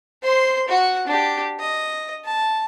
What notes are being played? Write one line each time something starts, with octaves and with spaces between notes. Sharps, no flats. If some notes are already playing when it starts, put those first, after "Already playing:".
C5 C6
F#4 F#5
D4 G4
D#5
A5